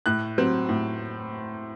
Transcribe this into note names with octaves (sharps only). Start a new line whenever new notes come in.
A2 F#6
F#3 C4
A2